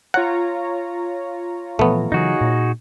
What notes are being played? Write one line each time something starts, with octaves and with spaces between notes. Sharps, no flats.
F4 C#5 F#5 A#5
A#2 E3 F3 A3 B3
C#3 E3 F#3 D#4 F#4 G#4
A#2